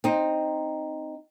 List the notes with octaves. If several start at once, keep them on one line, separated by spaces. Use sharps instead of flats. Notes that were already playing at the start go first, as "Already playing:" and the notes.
C4 D#4